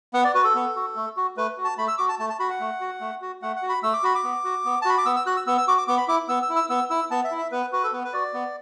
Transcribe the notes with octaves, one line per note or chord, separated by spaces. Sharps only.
B3 F#5
D5
F#4 B4
A4
B3
F#4
A3
F#4
A3 B4
F#4
A5
A3 B5
E6
F#4 D6
A5
A3 A5
A5
F#4 B5
F#5
A3
F#4
A3
F#4
A3 F#5
F#5
F#4
B5
A3 E6
D6
F#4 B5
D6
B3
F#4
B3
A5
F#4 B5
D6
B3 E6
E6
F#4 F#6
E6
B3 E6
E6
F#4 D6
D6
B3 D6
B5
E4 D6
B3 E6
E6
E4
E6
B3 E6
E4 E6
B3 A5
E5
E4
E5
B3 B4
F#4 B4
A4
B3 B4
B4
F#4 D5
B3